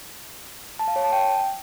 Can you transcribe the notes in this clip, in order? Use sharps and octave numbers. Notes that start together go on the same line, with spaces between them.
A5
F5
C#5
A5
G5